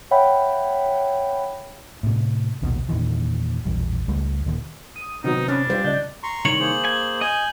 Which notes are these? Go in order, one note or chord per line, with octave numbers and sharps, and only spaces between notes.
C#5 E5 F#5 G5 B5
A2 C3
A#1 D#2 B2
E2 A#2 D#3 E3
E1 A#1 E2 G3
C#2 G3 A3
D#1 D#2
D#6
C3 D#3 F#3 B3 C4 D#4
C#4 D4 B5 F6
G3 F4 C5
C#3 D5 D#5 G6
A#5 C6 C#6
C2 D#3 C#5 F#7
A#3 G#4 C5
G#5
D#5 G#5 G6